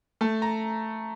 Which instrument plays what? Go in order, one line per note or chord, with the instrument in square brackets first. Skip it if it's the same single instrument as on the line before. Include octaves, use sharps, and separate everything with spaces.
[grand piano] A3 A5
A#5